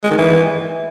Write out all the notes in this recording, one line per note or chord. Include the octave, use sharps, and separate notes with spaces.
G#3
D#3
E3